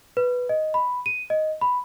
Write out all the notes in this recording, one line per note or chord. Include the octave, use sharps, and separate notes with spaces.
B4
D#5
B5
D#7
D#5
B5